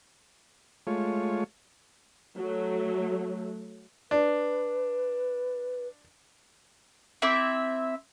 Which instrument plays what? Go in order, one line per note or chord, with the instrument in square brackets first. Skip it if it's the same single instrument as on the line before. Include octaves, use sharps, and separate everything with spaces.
[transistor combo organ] G#3 A3 F4 C#5
[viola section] F#3 A3
[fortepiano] D4 [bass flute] B4
[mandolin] C4 E4 E5 D6